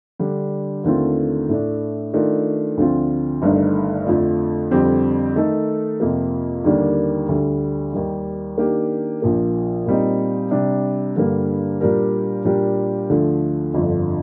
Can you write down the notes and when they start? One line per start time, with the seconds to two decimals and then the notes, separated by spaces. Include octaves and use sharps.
0.19 D3 G3 D4
0.84 D#2 D3 A3 C4 F4
1.49 A2 A3 D4
2.14 D#3 A3 D4 F4
2.77 D2 D3 F3 C4 F4
3.42 G1 G2 D#3 A3 D#4
4.07 F2 D3 F3 A3
4.71 F2 D3 G3 C4 G4
5.35 D#3 A3 D#4 A4
6.00 F2 C3 F3 A#3
6.64 D#2 D3 G3 A#3 D4
7.29 D2 D3 G3
7.93 D#2 D#3 G3
8.58 D#3 A#3 D4 G4
9.22 A#1 A#2 F3 A#3
9.86 A#2 G3 C4 D#4
10.51 C3 G3 D4
11.16 G2 D3 G3 A#3
11.81 A#2 G3 D4 G4 A#4
12.45 A#2 G3 D4 G4 A#4
13.10 D2 D3 F3 A3
13.74 G1 F2 D3 F3